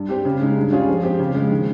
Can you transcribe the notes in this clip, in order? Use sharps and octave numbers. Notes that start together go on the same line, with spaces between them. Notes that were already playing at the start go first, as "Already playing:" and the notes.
Already playing: G2
G3 C4 G4
C#3
G#3 D#4
G2
G3 C#4 F4 G#4
F3
C4 G4
C#3
F3 G#3
D#3